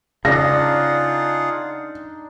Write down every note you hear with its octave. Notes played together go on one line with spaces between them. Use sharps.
C#3 D4 D#4 F4 G#4 F#5 A#6